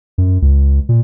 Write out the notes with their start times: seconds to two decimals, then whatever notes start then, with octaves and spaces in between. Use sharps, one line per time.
0.18 F#2
0.42 C#2
0.89 A#2